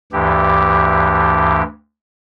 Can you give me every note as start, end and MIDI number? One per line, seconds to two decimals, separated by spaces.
0.12 1.62 38
0.12 1.62 43
0.12 1.62 52
0.12 1.62 67